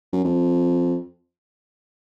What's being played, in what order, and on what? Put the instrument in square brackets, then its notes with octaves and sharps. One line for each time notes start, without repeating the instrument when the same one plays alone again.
[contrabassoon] F#2
F2